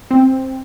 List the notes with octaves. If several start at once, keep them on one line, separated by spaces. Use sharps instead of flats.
C4